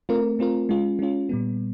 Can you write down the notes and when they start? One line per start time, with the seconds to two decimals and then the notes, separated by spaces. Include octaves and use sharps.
0.09 A3 C4 F4 A#4
0.39 A3 C4 F4 A#4
0.69 G#3 C#4 F4
0.99 G#3 C#4 F4
1.29 A#2 G3 B3